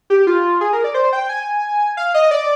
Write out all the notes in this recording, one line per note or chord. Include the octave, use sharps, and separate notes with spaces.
G4
F4
G#4
A#4
D5
C5
G5
G#5
F5
D#5
D5